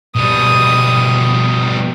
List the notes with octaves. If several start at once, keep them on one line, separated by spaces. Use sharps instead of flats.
B2 G3 D#6